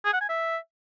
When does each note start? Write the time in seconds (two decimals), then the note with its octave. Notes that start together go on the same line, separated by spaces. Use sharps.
0.05 G#4
0.13 F#5
0.21 G#5
0.29 E5